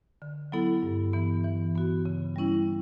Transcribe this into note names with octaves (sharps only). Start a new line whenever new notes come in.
D3
F#3 B3 E4 A4
G2
E3 B3
E3
B3 F#4
C#3
G3 C#4 E4